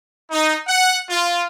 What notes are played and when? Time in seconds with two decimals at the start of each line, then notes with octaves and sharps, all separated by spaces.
0.31 D#4
0.67 F#5
1.09 F4